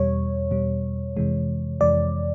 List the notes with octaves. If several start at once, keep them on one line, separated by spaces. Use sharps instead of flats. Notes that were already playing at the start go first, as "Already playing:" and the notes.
Already playing: E2 B2 G3 C#5
E2 B2 G3
F2 C3 E3 G#3
F2 C3 E3 G#3 D5